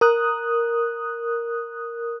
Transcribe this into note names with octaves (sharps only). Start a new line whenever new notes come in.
A#4 D#6 F#6